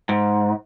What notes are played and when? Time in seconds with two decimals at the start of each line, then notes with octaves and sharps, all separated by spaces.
0.09 G#2